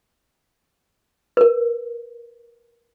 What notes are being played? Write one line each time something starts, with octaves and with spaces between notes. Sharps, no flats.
A#4 B4